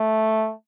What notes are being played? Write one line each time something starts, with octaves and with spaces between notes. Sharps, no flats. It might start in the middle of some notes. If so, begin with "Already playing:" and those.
Already playing: A3